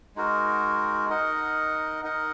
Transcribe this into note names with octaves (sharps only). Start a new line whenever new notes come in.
G#3 D#4 F#4 A#4
D#4 A#4 D#5 F#5
D#4 A#4 D#5 F#5